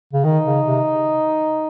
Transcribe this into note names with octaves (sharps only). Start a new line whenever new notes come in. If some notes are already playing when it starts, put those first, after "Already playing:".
C#3
D#3 D#4
C#3
C3